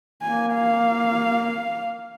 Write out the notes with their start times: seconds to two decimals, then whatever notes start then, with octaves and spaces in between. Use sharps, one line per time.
0.23 A#3 G#5
0.54 F5